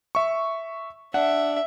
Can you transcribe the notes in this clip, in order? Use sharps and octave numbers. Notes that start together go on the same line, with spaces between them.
E5 C#6
D4 E5 F#5